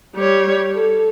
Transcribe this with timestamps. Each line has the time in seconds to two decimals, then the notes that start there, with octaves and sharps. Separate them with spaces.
0.15 G3 C#5
0.75 A4